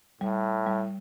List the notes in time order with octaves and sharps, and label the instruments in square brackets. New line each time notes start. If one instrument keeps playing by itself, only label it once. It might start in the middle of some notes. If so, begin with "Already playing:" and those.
[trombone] A2 [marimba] G3
[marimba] G3